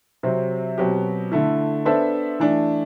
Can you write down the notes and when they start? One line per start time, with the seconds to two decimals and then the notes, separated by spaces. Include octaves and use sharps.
0.23 C3 F#3 C4
0.78 B2 F#3 C4 G4
1.32 D3 A3 E4
1.85 B3 D4 A4 C5 E5
2.40 E3 A3 D4